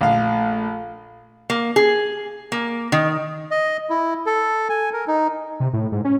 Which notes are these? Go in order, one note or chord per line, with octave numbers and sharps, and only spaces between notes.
A#1 A3 F5
A#3
G#4
A#3
D#3
D#5
E4
A4
G#5
A#4
D#4
C3
A2
G#2
C#4